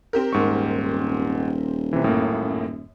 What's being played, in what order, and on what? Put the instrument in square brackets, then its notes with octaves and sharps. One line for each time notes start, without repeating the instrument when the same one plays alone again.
[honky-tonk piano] C4 G4 A#4
[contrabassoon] D#1 [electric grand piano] G#2 C#6
[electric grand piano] C3 E3
[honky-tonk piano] F#2 [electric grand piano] A2 A#3